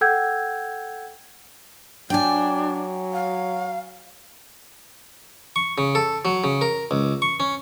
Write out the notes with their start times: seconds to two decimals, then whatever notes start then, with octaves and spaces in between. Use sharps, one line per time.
0.01 A4 F#5 G5 E6 G6 G#6
2.10 F#3 D4 G5 G#5
3.13 F5
5.56 C#6
5.78 C#3
5.95 A4
6.25 F#3
6.44 C#3
6.61 A#4
6.91 C#2
7.22 C#6
7.40 C#4